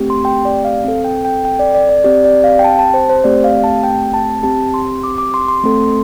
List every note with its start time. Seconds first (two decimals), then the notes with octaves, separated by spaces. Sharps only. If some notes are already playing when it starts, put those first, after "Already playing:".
Already playing: A3 C4 G4
0.10 C6
0.25 G5
0.45 D5
0.64 F5
0.84 C4 A4
1.05 G5
1.25 G5
1.45 G5
1.59 D5
1.75 D5
1.89 D5
2.04 C4 G4 D5
2.24 D5
2.44 F5
2.59 G5
2.64 A5
2.79 A5
2.94 C5
3.09 C5
3.24 A3 C4 G4 D5
3.44 F5
3.64 A5
3.84 G5
4.14 A5
4.43 C4 G4 A5
4.74 C6
5.04 D6
5.18 D6
5.34 C6
5.48 C6
5.64 A3 C4 A4